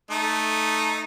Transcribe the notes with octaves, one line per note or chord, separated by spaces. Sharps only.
A3 D#4